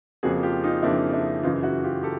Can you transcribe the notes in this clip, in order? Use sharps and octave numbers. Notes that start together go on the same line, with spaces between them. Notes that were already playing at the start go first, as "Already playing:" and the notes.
F2 C#3 F3 A#3 F#4 G#4
F4 G4
D#4 F4
F2 C#3 F3 A#3 D4 E4
D4 E4
F#2 C#3 E3 D#4 F4
E4 F#4
F4 G4
G4 A4